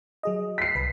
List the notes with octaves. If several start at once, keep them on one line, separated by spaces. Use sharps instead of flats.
F#3 G#4 D#5
B6 C7
C2 B4